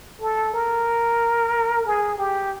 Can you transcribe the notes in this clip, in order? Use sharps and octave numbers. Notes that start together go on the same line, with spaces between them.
A4
A#4
G#4
G4